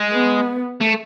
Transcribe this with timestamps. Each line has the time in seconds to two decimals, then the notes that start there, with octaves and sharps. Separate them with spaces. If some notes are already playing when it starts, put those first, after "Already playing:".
Already playing: G#3
0.12 B3
0.81 A3